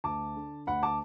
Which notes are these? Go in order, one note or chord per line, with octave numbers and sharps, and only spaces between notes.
D2 A5 D6
D3
D2 F#5 B5
A5 D6